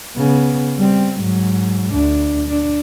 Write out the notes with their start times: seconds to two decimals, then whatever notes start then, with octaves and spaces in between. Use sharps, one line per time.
0.16 C#3 B3
0.78 G3 C4
1.20 G#2 F#3
1.91 D2 D4
2.48 D4